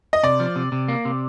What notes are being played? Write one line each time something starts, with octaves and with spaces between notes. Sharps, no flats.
D#5
C3 D5
F3
C3
C3
A#3
C3